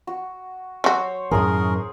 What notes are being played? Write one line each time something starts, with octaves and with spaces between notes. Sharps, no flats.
F#4
F#3 F#4 C5 C#5
F#2 A2 D#3 G#4 A#4 D#6